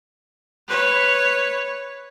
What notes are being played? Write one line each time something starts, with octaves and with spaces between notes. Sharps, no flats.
B4 C#5